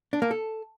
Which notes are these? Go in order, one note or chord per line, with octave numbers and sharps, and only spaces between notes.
D4
A#3
A4